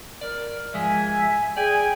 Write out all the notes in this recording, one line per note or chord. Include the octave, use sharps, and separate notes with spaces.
A#4 D5
G#2 F3 G#3 E5 G#5
G#4 D5 G5 G#5